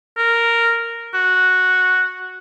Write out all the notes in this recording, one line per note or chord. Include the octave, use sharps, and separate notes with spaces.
A#4
F#4